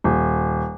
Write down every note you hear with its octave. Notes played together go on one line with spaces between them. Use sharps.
D#1